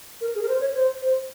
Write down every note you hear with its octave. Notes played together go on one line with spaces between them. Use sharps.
A#4
G#4
A#4
C5
C#5
C5
C5